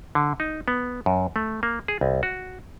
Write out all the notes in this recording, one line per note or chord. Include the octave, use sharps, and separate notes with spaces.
D3
D#4
B3
F#2
A3
A#3
G#4
C2
F#4